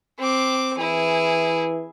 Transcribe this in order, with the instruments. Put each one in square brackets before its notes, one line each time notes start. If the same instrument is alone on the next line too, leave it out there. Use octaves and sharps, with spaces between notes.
[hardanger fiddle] C4 D6
[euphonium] E3 [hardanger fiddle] E4 G#4